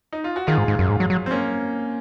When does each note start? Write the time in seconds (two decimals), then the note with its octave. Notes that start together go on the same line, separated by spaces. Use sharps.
0.13 D#4
0.24 F4
0.36 F#4
0.47 D#3 F4 G#4
0.58 G#2
0.68 G#2
0.79 F#2
0.89 G#2
1.00 F#3
1.10 F#3
1.26 C4
1.31 A#3 C#4